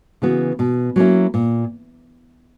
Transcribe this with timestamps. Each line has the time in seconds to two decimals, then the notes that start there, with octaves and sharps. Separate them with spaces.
0.22 C#3 E3 B3 F#4
0.59 B2
0.96 F#3 A#3 C#4 E4
1.34 A#2